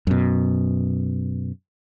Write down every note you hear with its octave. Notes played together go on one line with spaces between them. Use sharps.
F#2 B2